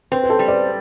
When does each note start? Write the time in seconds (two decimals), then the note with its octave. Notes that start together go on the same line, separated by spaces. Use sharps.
0.12 C4 B4
0.23 B4
0.29 A4 C5
0.39 G3
0.48 B4 D5